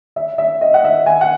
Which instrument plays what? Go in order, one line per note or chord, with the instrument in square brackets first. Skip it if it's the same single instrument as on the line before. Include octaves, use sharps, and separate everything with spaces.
[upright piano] E5
E5
D#5
F#5
E5
G#5
F#5